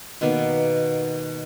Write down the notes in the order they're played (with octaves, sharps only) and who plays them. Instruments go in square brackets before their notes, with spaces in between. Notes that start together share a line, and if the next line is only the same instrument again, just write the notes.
[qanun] B2 D#3 A#3 B3